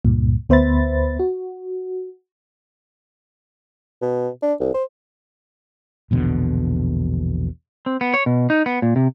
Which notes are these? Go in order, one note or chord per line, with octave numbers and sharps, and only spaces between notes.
C#2 G2 A#2
D2 B3 C5 E5 B5 A6
F#4
B2
D4
C2
C5
A#1 E2 B2 D3
C4
B3
C#5
B2
D#4
B3
A#2
C3